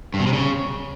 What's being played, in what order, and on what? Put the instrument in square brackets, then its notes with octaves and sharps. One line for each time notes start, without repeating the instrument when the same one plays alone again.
[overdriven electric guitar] G2
B2
C3
C#3